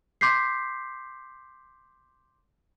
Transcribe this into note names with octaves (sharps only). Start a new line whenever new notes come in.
C6 D6 G6 B6 C7